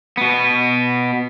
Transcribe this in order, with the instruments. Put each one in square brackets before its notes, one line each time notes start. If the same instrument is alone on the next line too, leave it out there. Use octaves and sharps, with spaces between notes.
[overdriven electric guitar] B2 B3